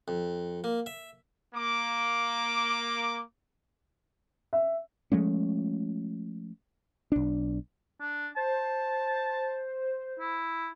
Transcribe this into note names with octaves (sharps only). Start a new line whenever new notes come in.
F2
A#3
E5
A#3 D6
E5
F3 G#3 A3 C#4
B1 D4
D4
C5 A5
E4